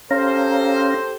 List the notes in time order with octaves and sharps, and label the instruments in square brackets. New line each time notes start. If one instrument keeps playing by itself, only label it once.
[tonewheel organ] C#4 F5 A#5 [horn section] G4 A4 C5